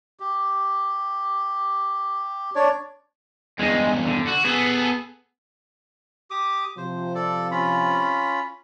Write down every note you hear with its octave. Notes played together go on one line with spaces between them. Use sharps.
G4
D4 C#5 D5
E2 G2 G#3
D3
F#4
B3 G#4 A4
G4 D6 D#6
C3 F3 C5
A4 D5
C#4 F4 B5